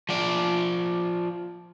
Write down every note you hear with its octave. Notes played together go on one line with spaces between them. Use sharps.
F3 D5